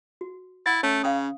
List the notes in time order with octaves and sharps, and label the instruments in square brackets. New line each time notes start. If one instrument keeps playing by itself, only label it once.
[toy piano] F#4
[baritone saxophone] E4 [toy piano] F#5 [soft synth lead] A6
[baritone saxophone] A3 [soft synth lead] C#4
[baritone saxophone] C#3 [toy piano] F5 G5 D#6